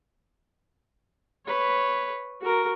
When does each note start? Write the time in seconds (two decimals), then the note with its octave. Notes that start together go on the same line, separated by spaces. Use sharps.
1.46 B4 C#5
2.41 F#4 A#4